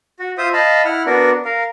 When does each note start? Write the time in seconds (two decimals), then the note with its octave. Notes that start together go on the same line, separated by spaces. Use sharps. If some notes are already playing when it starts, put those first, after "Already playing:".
0.20 F#4
0.38 F4 C5 E5 D#6
0.53 D#5 F5 A5 B5
0.85 E4 F#5 F6
1.06 B3 D4 F#4 A#4
1.45 A#4 F5